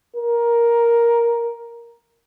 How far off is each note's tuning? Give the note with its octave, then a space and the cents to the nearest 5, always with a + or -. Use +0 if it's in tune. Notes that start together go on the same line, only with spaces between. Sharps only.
A#4 +10